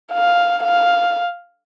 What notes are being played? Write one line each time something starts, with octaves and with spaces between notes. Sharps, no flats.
F5
F5